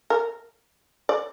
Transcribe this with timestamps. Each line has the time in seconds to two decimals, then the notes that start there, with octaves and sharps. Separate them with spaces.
0.10 A#4
1.09 D5